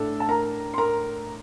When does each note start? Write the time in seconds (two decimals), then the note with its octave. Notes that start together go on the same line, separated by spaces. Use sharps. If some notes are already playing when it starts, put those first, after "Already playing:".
Already playing: A2 A3 D4 A4
0.20 A5
0.28 A#4 A#5
0.74 C6
0.78 A#4 A#5